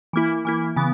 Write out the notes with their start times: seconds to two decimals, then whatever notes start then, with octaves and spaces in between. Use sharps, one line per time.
0.13 E3 A#3 E4
0.45 E3 A#3 E4
0.76 C#3 E3 B3